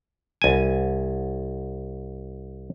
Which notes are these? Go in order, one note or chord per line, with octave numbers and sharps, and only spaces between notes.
C2 G#5